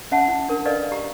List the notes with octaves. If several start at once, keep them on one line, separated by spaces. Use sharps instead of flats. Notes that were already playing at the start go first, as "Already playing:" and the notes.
C#4 E5 F#5 A5
E4
D4 A#4
A4 B4 D5 D#5 F5
G4 A#5